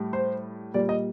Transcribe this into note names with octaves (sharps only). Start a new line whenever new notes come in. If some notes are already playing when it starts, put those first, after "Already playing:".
Already playing: A2 G3
C5
A#2 G3 D5
D#5